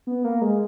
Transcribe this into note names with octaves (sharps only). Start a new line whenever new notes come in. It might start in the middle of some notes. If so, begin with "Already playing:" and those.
B3
A#3
G#3